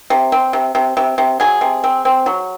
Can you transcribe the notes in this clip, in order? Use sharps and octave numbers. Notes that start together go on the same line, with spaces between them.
C3
C4
C3
C3
C3
C3
F#3 G#4
C3
C4
C4
F#3